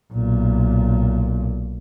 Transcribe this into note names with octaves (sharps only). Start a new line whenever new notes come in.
B1 A#2